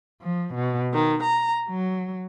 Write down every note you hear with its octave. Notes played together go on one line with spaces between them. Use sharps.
F3
B2
D#3
A#5
F#3